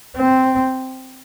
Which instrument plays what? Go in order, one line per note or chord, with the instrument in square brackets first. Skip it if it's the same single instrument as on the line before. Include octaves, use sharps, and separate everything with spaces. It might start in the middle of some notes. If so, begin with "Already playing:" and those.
[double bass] C4